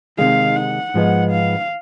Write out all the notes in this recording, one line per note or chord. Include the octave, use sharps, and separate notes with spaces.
C3 D#3 G#3 F5
F#5
G#2 F3 G#3 B3
F5